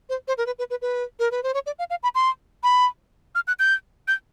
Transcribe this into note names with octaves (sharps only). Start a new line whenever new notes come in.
C5
C5
A#4
B4
B4
B4
B4
A#4
B4
C5
C#5
D5
F5
F5
B5
C6
B5
F6
F#6
G6
G6